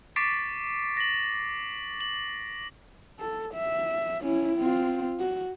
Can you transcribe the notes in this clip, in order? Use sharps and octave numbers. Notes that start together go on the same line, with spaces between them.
C#6 D6 A6 B6 C7 D7
A#6 F#7
F#7
A4
E5
C#4 E4
C4 F4
F#4